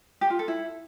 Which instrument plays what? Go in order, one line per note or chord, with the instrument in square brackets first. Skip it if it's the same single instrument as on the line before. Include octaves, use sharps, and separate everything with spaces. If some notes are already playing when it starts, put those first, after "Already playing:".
[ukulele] G4
F4
A4
E4